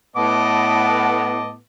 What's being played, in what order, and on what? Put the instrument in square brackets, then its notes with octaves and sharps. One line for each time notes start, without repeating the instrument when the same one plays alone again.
[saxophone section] A2 B3 [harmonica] D#5 A5 D6